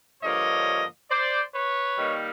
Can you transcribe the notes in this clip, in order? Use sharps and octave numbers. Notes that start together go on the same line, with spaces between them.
G2 D3 F3 A#3 C#5 D#5
C5 D5
B4 C#5
D#3 G3 A#3 D#4